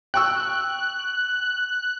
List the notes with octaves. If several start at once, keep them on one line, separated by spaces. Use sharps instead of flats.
G5 C#6 E6 F#6